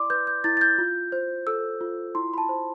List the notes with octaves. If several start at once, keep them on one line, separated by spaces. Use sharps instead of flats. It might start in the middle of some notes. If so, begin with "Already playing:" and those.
Already playing: E4 D5 C6 D6
B4 G6
G6
E4 A6
A6
G6
F4
C5
A4 E6
F4
E4 C6
B5
A5
C5